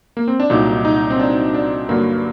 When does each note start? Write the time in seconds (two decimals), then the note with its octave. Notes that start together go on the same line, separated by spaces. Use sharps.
0.17 A#3
0.28 C4
0.40 D4
0.50 C2 A#2 F#3 D#4
0.85 D#4
1.10 C4
1.20 D4
1.54 D4
1.89 G2 D3 F#3 A#3